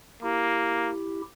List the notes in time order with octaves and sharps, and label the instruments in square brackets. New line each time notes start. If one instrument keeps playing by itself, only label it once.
[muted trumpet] A#3 [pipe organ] E4 G4